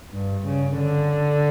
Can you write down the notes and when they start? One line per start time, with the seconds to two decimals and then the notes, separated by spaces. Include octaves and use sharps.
0.14 G2
0.46 C#3
0.78 D3